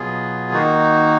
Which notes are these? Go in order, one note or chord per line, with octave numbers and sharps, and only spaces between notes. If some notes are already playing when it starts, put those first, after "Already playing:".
Already playing: B2 F#3 B3 F4 G#4
D#3 A#3 D#4 F#4